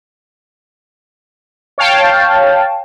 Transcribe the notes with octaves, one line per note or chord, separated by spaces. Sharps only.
C#5 F5 G5 A5